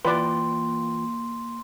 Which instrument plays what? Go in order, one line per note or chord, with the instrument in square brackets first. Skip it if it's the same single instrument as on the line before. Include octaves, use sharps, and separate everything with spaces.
[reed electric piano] E3 F4 G5 [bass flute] A#3 [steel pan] B4 D5 [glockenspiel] C6